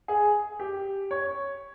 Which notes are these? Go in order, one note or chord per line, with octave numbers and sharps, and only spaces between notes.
G#4
G4
C#5